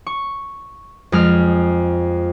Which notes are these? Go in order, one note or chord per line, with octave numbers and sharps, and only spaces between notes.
C#6
F2 G#3 F6